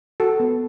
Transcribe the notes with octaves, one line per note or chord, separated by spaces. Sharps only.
F#4 A4
B3